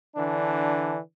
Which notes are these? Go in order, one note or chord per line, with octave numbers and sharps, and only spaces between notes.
D3 E3 D4